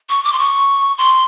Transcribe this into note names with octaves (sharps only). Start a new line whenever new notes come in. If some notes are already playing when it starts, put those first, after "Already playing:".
C#6
D6
C6
C#6
C6